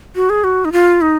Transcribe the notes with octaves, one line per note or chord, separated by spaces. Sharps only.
F#4
G#4
F#4
D#4
F4
D#4